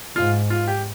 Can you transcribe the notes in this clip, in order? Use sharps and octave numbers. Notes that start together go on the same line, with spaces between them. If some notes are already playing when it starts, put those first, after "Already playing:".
G#2 F4
F4
G4